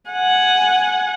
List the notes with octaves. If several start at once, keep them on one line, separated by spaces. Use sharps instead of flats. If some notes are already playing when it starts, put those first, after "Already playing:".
F#5 G#5